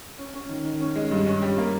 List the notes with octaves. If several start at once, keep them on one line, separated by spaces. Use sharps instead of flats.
C#4
C#4
D#3
D#3
C#4
G#3
G2
C#4
G3
A#3